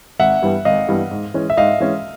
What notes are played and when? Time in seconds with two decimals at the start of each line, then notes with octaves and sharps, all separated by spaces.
0.20 G#1 E5 F#5
0.42 G2 E3 G3 B3
0.65 G#1 D#5 F5
0.89 G2 E3 G3 B3
1.11 G#2
1.34 E3 G#3 C#4
1.50 E5
1.57 G#2 D#5 F5
1.80 E3 G#3 C#4